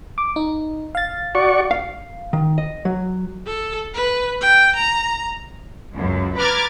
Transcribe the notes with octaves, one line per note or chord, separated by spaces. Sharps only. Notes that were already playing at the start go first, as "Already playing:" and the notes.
D6
D#4
F5 A6
F#4 D5 C#6
F5
D#3
D#5
F#3
A4
B4
G5
A#5
C#2 F#2
B4 A#5 D6 F6 G#6 A6